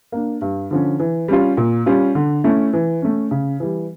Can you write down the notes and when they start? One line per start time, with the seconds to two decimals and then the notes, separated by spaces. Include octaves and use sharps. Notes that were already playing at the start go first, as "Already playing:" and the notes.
0.12 A#3 D4
0.42 G2
0.71 D3 F3 C#4
1.00 E3
1.28 G3 C#4 F4
1.57 A#2
1.86 G3 C#4 F4
2.15 D3
2.44 A3 C#4 E4
2.73 E3
3.02 A3 C#4
3.31 C#3
3.60 E3 G3